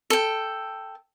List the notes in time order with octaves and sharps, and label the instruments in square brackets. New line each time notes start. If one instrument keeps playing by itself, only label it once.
[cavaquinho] A4 G5